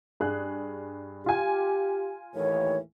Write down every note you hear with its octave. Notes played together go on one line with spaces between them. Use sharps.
G2 G#4 F#6
F4 G4 G#5
D#2 A2 E3 C#5